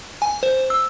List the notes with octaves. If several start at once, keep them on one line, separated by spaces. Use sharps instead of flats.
G#5
C5
E6